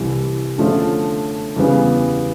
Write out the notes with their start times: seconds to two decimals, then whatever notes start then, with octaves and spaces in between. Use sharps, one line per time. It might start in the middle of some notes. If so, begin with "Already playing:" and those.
Already playing: C2 C3 E3
0.58 D3 F3 A3 C#4 F4
1.56 E2 C#3 E3 G3 B3